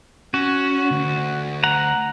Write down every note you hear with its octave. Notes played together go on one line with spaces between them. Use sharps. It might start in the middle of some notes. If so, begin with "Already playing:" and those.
C#4 F#4
D2
F#5 A#5